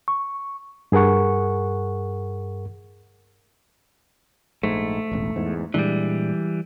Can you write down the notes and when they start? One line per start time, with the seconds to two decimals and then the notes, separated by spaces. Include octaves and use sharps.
0.08 C#6
0.92 G2 G#4 A#4 F#5 C#6
4.63 A#1 G#2 A3
5.11 E1 A1
5.36 E2 G#2
5.74 A#2 E3 G3 G#3 D4